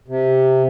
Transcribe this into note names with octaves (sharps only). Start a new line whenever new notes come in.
C3